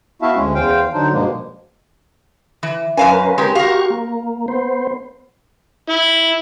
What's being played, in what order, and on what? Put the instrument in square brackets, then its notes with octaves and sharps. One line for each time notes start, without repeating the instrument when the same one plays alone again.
[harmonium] B3 E4 F#4 E5 F5 A5
D2 G#3 C#4
E2 C5 F5 G5
D3 F#3 D4 D#4 C5
G2 B2 F3 G#3 A#3
[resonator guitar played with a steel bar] E3
[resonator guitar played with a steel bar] F#2 F5 G#5 [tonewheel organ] C#4 A#4 B4
[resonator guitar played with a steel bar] G#3 G4
[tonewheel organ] F#4 G4 C#6 [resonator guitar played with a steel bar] A#4 F5
[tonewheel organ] A#3
B3 C5
[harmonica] E4